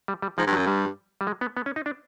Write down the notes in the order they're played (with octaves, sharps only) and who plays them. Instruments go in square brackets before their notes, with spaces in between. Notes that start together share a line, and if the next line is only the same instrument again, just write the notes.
[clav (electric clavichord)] G3
G3
[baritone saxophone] G#2 [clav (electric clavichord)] F3
[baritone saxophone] G2
[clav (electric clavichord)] F#3
[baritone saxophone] F#2
[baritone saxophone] G2 [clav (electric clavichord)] G3
[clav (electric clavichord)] G3
G#3
B3
B3
C#4
D#4
D4